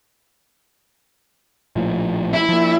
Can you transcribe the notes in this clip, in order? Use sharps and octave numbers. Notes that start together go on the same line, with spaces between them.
A#1 A2 F3
E4
F3 A#3